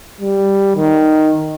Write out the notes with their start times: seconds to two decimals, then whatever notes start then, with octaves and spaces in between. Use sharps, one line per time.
0.21 G3
0.76 D#3